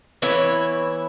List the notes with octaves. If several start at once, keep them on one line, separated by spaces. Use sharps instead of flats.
E3 B3 E4 C#5